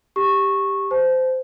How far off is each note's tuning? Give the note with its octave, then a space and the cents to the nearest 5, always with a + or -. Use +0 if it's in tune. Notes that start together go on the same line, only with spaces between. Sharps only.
G4 +5 C#6 -10
C5 -20 A5 -30